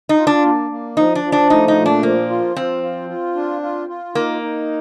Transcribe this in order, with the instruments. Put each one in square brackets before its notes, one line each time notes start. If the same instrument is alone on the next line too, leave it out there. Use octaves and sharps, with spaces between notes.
[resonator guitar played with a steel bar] D#4
[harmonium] F4
[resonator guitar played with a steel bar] D4
[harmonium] A#3
A#3
[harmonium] F3 [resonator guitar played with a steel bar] D#4
[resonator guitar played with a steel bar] D4
[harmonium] F3
[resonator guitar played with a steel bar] D4
[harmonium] A3 [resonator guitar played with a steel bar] D#4
[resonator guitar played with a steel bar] D#4
[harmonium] A#2
[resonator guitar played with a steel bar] D4
[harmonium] F3 [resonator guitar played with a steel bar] A#3
[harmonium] F4
[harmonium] F3 [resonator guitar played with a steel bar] C4
[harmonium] F4
F4
D4
F4
F4
[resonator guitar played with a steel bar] A#3 [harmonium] D#4
[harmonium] D#4